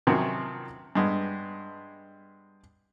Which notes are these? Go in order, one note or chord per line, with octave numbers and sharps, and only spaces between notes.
C3 D#3 F3 F#3 C4 C#4
G2 G#3 B3